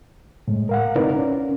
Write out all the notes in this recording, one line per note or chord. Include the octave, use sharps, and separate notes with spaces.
A2 G#3
A#4 F5 F#5
C4 D#4 E4 A#4 B4 D5
C#4